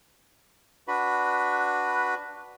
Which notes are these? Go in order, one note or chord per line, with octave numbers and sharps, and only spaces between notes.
D4 F#4 B4 B5